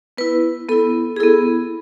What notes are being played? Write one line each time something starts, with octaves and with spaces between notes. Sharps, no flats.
B3 E4 B4
B3 E4 A4
G#4
B3 E4 A4